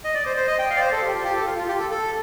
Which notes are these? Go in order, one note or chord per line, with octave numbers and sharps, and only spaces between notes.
D#5
D5
C5
C5
D#5
G5
F5
D5
C5
A4
G4
F4
G4
A4
F4
F4
G4
A4
A4